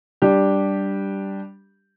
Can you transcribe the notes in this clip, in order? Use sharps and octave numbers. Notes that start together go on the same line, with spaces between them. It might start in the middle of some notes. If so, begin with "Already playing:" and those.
G3 D4 G4